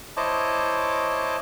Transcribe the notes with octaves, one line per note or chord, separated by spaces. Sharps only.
E4 C5 C#5 D#5 A5 D6